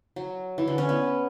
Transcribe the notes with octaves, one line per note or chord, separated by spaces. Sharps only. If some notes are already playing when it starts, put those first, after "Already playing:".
F#3
E3
D3
C#4
B3